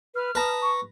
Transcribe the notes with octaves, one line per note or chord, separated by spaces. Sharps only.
B4 F6
B4 A5 A#5 D#6
C#6